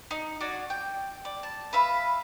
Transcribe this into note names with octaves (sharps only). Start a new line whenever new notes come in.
D#4
D4 F#4 C#5 D5
G5
D5
A5
B4 E5 F5